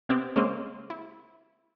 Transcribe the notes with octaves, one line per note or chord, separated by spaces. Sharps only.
C3 B3 C4 G4
C#3 G#3 A#3 C4
E4